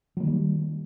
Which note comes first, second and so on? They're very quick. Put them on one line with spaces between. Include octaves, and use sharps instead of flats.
F#3 A#3 D#3 G3